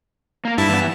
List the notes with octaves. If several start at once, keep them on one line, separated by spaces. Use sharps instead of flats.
A#3 A#4
G2 E4 E5 A5
E3 B3